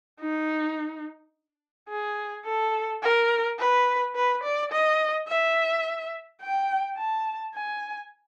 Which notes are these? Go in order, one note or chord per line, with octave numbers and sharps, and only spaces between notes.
D#4
G#4
A4
A#4
B4
B4
D5
D#5
E5
G5
A5
G#5